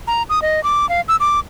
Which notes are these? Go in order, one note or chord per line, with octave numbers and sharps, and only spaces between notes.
A#5
D#6
D#5
D6
F5
E6
D6